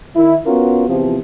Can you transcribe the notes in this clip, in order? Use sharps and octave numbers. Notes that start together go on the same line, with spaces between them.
D#3 E4
B3 C#4 F4 F#4 A#4
E2 C3 F3